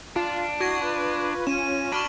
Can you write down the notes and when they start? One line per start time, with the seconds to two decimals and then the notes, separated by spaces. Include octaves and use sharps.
0.16 D4 F4
0.60 E4 F#4 C#6 G#6 A#6
0.81 F4 B4
1.47 C#4 D#7 E7
1.92 D4 F#4 B5 C#6 F6 F#7